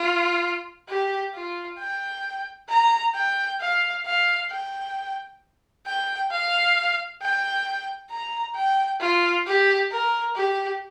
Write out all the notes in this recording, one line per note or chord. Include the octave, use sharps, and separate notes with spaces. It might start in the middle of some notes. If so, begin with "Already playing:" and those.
Already playing: F4
G4
F4
G5
A#5
G5
F5
F5
G5
G5
F5
G5
A#5
G5
F4
G4
A#4
G4